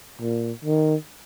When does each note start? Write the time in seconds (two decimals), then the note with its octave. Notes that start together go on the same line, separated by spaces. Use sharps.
0.21 A#2
0.64 D#3